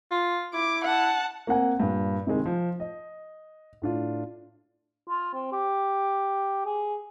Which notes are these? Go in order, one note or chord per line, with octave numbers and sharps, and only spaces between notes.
F4
E4 D6
F#5 A5
A#3 C4 F#5 G#5
G2 A#2
C3 D#3 G#3
F3
D#5
A2 D4 F4
F4
C4
G4
G#4